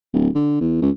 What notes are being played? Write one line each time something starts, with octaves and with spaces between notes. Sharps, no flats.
D1
D3
E2
C#2